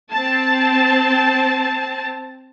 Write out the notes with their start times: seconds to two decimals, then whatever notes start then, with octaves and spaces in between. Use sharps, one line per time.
0.12 C4 A5